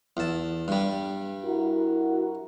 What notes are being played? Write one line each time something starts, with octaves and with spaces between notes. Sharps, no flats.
E2 A5
G2 G3
E4 F#4 A#4